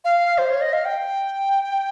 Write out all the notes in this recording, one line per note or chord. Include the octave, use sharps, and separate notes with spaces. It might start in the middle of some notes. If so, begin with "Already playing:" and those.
F5
C5
C#5
D#5
F5
G5